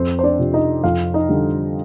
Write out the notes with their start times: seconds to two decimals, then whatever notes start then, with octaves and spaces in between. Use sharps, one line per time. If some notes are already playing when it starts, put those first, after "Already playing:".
Already playing: F2 C4 C5
0.19 C5
0.23 D4 D5
0.39 C3 F3
0.54 D#4 D#5
0.84 F2 F4 F5
1.14 D#4 D#5
1.29 D3 G3